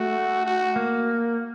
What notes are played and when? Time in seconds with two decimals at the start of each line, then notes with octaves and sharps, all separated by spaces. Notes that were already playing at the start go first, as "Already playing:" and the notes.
Already playing: A3 F#4
0.45 F#4
0.76 A#3